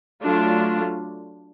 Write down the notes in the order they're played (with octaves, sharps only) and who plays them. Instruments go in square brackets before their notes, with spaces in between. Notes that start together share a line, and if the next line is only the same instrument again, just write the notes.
[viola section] F#3 A3 D4 F4